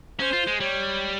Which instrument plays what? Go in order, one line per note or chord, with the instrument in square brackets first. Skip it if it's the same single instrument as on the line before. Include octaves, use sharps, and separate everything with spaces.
[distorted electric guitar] C#4 [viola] C5
[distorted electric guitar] F4
G#3
[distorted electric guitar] G3 [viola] C#5